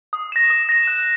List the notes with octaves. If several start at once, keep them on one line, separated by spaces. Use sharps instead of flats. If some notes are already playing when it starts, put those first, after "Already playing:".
D#6
A#6 E7
D#6
A#6 E7
F#6